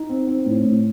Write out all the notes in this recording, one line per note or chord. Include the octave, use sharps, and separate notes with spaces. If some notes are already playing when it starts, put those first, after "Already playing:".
Already playing: D#4
C4
C4
A2
A2